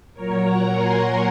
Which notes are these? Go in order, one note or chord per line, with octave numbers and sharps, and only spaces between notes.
A#2 F#3 A#4 C#5
F#5 A#5
G#5 C6